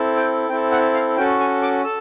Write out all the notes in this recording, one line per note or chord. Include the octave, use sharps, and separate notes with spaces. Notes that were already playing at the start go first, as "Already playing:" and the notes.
Already playing: C4 E4 A4
G5
C4 E4 A4 G5
F#5
F5
C#4 F#4 A4 G5
G#5
D6
A4 E6